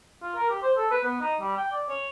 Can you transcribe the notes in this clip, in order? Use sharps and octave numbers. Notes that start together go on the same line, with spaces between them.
F4
A#4
G4
C5
A4
B4
B3
D#4
G3
G5
D5
C#5